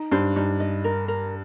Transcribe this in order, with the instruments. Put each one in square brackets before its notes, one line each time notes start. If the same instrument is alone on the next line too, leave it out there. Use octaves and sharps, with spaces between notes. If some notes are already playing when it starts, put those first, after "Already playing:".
Already playing: [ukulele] D#4
[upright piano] G2 [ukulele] C5
[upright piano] G2 [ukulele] D#4
[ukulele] D#5
A#4
A#4